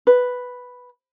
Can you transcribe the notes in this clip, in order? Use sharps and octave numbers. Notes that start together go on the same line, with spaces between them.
B4